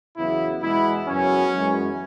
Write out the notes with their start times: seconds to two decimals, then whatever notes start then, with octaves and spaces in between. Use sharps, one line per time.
0.17 E2 C#3 F#3 B3 E4
0.62 E2 B2 G#3 B3 E4
1.07 F#2 C#3 F#3 B3 C#4
1.52 F#2 E3 G#3 B3